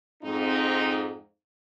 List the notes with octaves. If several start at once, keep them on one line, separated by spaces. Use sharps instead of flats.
F2 G#2 C4 D#4